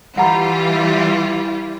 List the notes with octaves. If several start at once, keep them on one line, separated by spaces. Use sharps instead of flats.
E3 G3 F4 F#5 A#5 B5